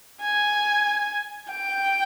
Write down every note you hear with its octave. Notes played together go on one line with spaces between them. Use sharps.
G#5
G5